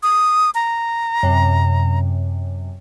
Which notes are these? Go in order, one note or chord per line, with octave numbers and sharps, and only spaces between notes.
D#6
A#5
F#2 C3